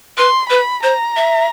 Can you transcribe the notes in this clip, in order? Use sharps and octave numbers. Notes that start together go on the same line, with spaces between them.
B4 C6
B4 B5
C5 A#5
E5